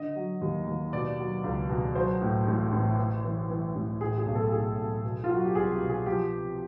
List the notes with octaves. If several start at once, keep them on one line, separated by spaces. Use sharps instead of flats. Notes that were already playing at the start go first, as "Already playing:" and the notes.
Already playing: D3 D#5
F#3
D#2
D#2
B2 D5
F#3
C#2
B2
F#3 C5
A2
A1
A1
E3
E3
E3
A1
A2 G#4
G#4
B1
A4
B1 G#4
B1
B2
F4
F#3
F#4
G4
C2 G#4
G4
B2
G#4
F3 G4
C3